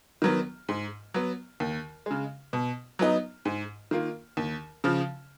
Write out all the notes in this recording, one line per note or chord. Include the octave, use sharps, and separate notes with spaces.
D#3 F#3 B3
G#2
F#3 B3
D#2
C#3 G#3
B2
F#3 B3 D#4
G#2
D#3 A#3 F4
D#2
C#3 F3